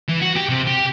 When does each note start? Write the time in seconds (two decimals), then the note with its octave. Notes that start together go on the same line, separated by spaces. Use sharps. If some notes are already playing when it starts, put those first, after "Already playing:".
0.08 E3
0.21 F#4
0.36 G4
0.49 C3
0.67 G4